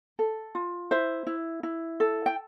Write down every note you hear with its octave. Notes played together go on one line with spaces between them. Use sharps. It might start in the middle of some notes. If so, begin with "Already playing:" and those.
A4
F4
E4 C5 E5
E4
E4
A4
G5